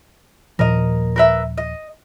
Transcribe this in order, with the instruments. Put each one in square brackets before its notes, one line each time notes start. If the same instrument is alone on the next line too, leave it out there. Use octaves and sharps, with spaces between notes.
[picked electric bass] D#1 A#2 F3 [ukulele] A#4 D#5
[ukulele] A#4 B4 E5
D#5